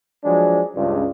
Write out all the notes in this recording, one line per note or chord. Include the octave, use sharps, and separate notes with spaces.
F3 F#3 G#3 D4
C#2 G2